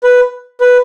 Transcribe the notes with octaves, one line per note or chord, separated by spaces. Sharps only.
B4
B4